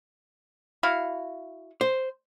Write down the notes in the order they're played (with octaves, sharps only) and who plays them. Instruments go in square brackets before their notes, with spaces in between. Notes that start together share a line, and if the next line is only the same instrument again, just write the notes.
[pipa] E4 F#4 F5
[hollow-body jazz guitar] C5